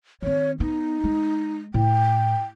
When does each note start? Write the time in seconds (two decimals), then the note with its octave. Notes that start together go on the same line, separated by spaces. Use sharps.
0.22 D#3 C4 C#5
0.60 B3 D#4
1.04 G#3
1.74 A2 G5